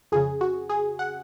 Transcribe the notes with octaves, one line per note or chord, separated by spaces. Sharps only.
F2 C#3 G#4
F#4
G#4
F#5